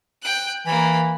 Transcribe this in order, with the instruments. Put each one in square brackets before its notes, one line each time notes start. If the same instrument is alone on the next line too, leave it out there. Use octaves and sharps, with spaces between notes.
[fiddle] G5 F#6
[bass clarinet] E3 [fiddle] A#3 B5